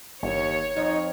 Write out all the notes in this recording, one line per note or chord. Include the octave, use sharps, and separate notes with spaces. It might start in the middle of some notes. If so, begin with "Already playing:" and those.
G1 D#2 C#5
F2 D#4